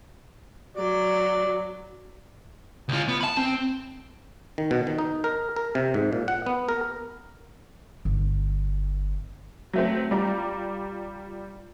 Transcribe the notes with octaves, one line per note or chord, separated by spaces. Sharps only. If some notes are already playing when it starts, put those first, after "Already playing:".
F#3 D5
C#2 F4
B3
A5 B5
C4
D#3
B2
D#3
D#4
A#4
A#4
C3
G#2
A#2
F#5
B3
A#4
G1
F#3 A3 C4
G3 F4 D5 A#5